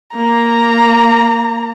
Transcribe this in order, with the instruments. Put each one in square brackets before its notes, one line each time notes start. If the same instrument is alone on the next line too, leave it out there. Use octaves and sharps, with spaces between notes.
[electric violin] A#3 [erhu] A#5